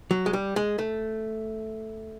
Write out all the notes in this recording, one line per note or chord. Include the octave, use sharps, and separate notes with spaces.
F#3
G#3
G3
G#3
A3